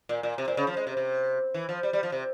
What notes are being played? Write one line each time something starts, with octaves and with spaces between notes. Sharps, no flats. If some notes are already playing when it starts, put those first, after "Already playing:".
A#2
A#2
C3
A#2
C#3
F3
G#3
C3
C3
E3
F3
G3
G3
F3
C3